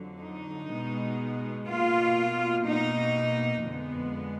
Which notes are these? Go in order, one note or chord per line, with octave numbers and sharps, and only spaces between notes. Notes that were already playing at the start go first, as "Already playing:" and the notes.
Already playing: F2 D3 F#3
D#4
B2 G#3 B3
B2 A#3 F4
B2 A#3 D#4
F2 D3 G#3 B3